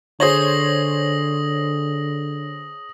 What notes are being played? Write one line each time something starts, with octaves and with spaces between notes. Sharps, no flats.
D3 G#4 C5 C#5 D#6 A#6 F#7